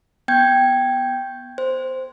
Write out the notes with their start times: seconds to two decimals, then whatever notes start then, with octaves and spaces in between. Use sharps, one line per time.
0.28 B3 G5 G6 G#6
1.58 C5